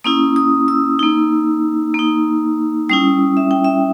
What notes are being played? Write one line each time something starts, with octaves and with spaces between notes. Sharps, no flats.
A#3 C#4 E4 D#6
D#6
E6
A#3 D#4
A#3 D#4
G3 C#4 E4 D#6
E5
G5
E5